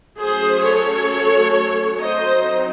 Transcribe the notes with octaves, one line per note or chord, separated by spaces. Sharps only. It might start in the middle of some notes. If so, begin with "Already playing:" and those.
F#3 A3 C#4 G#4 C5
A4 C#5
F#3 C4 D#4 C5 D#5